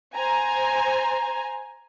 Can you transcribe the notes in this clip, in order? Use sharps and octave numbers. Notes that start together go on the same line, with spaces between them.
C5 G#5 A#5